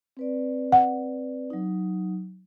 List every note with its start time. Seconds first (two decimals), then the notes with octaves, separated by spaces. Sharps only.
0.17 C4 B4 D5
0.72 F#5
1.50 F#3 D#4